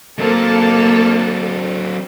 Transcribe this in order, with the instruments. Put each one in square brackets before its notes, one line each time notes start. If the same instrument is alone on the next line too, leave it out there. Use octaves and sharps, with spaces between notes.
[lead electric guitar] F#3 C4 [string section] A#3 A4